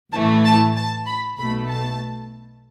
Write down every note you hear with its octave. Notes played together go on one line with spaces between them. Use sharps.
A1 A2 E3 A3 A5
A5
A5
B5
B1 B2 A3 B5
A5